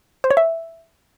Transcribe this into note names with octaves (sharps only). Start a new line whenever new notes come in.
C5
C#5
E5